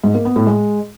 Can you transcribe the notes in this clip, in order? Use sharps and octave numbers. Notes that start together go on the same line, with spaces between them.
G#2
A#3
B3
A2
G#3